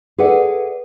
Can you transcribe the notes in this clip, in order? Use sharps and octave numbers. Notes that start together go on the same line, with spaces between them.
G#4 A4 B4 D5 E5 F#5